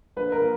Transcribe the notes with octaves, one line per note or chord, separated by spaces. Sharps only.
A#1 B4
A#4
A#2